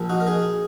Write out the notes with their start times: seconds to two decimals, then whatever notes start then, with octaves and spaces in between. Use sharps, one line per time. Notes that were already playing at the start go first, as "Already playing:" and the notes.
Already playing: A#1
0.09 D#4 F#4
0.20 A#4
0.27 D#4 G#4